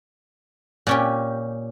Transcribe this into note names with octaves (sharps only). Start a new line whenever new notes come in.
A#2 C#4 G4